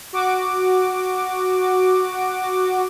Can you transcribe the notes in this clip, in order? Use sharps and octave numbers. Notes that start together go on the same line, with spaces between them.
F#4 D6